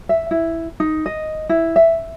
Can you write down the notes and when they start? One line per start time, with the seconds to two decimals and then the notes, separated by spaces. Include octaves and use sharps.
0.09 E5
0.31 E4
0.80 D#4
1.06 D#5
1.49 E4
1.76 E5